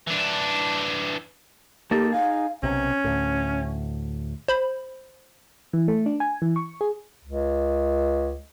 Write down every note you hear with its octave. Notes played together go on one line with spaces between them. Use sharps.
E3 D4
A#3 D#4 G4 A4
D#4 G#4 F5
B1 C3 C#4
D2 A2
C5 B5
E3
A3
D4
G#5
E3
C#6
G#4
C#2